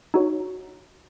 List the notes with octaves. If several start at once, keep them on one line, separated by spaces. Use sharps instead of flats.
D#4 F#4 C#5